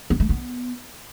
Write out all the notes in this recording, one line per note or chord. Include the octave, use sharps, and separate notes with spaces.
B3
A3
B3